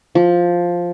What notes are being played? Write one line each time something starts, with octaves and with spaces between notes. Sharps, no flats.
F3